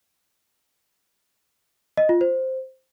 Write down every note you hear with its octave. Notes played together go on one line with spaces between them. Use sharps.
D#5
F4
C5